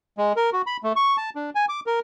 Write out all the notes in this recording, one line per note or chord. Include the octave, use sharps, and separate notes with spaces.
G#3
A#4
F#4
B5
A3
C#6
A5
D4
G#5
D6
A#4